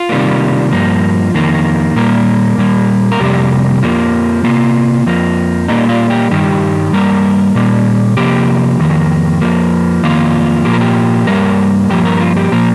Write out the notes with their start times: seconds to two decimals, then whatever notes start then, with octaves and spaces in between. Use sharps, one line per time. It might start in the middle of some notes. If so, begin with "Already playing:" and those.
Already playing: F4
0.09 C3 D#3 G3 A#3
0.71 G2 F3 A#3
1.34 F2 D#3 A#3
1.96 A#2 G3 A#3 A#4
2.58 A#2 G3 A#3
3.12 A#4
3.20 F2 C3 G3 A#3 G4
3.82 F2 F3 A#3
4.44 C3 D#3 A#3 F4
5.06 F2 F3 A#3
5.68 A#2 G3 A#3 D#4
5.89 F4
6.10 G4
6.31 G2 D#3 G3 G4
6.93 G2 G3 A#3 A#4
7.55 A#2 G3 A#3
8.17 C3 F3 A#3 G4
8.80 F2 D#3 A#3
9.41 F2 F3 A#3
10.03 F2 D#3 A#3 F4
10.65 A#2 F3 A#3 G4
10.73 A#4
10.81 G4
11.27 G2 G3 A#3 A#4
11.90 G2 F3 A#3 G4
12.05 A#4
12.20 F4
12.37 G4
12.52 A#2 F3 A#3 A#4